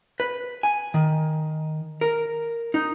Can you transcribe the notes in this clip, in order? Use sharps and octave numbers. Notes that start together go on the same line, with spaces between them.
B4
G#5
D#3
A#4
D#4